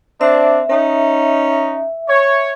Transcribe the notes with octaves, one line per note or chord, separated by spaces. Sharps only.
C4 D4 E5
C#4 D#4
C#5